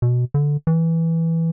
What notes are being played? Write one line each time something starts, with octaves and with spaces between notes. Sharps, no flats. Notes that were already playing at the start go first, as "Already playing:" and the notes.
B2
D3
E3